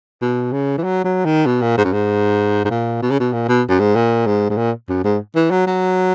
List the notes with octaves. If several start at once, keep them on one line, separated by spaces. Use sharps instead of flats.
B2
C#3
E3
F#3
F#3
D#3
B2
A#2
G#2
F#2
G#2
G#2
A#2
B2
C#3
B2
A#2
B2
F#2
G#2
A#2
G#2
G#2
A#2
F#2
G#2
E3
F#3
F#3